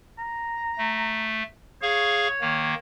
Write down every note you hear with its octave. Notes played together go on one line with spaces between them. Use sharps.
A#5
A3
G#4 C#5 F5 C#6
D#3 A#3